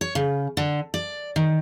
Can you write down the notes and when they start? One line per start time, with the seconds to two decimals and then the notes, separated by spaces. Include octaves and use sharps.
0.01 C#5
0.15 C#3
0.57 D3
0.94 D5
1.36 D#3